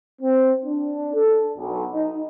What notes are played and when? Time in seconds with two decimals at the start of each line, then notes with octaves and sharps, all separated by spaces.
0.22 C4
0.65 D4
1.14 A4
1.58 B1
1.92 D#4